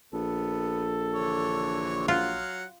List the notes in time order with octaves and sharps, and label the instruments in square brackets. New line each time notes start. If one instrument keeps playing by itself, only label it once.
[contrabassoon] A#1 [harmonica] B3 [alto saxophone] A4
[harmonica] D3 E3 C#5
[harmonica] F#3 F5 F#5 [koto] F4